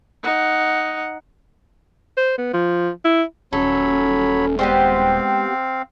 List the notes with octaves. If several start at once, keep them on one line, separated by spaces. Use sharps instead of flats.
D#4 F#5
C5
B3
F3
E4
D#1 F#3 C#4 A4 C#5 B5
G#3 B3 C4 G4 C5 F5